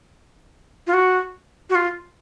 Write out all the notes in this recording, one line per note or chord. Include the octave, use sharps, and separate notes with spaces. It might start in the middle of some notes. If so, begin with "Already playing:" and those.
F4
F#4
F#4
F4